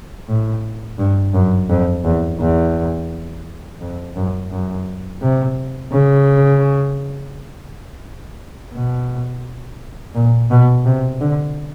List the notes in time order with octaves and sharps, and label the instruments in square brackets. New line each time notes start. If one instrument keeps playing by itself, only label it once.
[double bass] A2
G2
F#2
F2
E2
E2
F2
F#2
F#2
C3
C#3
B2
A#2
B2
C3
D3